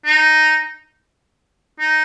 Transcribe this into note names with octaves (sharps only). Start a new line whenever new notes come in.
D#4
D#4